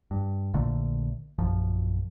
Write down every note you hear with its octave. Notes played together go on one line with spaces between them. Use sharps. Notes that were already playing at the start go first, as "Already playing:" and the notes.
G2
A#1 A#2 D3 A3
A#1 F#2 F3